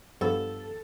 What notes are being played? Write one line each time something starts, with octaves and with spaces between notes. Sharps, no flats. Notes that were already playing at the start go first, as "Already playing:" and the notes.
G2 F3 B3 A4